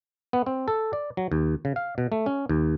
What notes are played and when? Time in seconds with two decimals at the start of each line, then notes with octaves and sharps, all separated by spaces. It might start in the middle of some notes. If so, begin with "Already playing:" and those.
0.33 B3
0.46 C4
0.68 A4
0.93 D5
1.17 F#3
1.32 D#2
1.65 C#3
1.76 F5
1.98 B2
2.12 A3
2.26 C#4
2.49 D#2